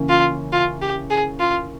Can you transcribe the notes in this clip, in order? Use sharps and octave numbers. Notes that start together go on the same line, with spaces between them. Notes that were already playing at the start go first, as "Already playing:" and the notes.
Already playing: C#3 E3 A#3 C#4
F4
F4
G4
G#4
F4